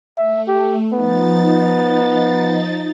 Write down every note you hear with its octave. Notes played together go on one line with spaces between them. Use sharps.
A3 E5
G4
F3 B3 D#4 A6